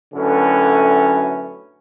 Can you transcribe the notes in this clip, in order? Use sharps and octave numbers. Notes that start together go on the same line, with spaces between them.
F#2 A2 D3 A3 C#4 B4